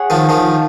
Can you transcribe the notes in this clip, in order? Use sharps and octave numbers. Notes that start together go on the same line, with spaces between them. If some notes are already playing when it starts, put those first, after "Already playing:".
Already playing: G#4 C#5 F#5
D#3 F3
D#3 F3